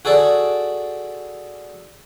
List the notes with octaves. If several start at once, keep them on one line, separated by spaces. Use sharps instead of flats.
F#4 G#4 A4 D5